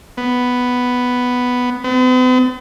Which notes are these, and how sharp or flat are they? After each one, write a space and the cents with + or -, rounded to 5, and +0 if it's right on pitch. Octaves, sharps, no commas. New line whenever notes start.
B3 +0
B3 +45